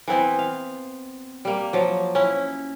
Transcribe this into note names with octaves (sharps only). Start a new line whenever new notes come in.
E3 B3 C4 E4
F5
G3 A#3
F3 F#3
C#4 E4